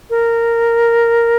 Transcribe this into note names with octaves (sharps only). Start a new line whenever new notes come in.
A#4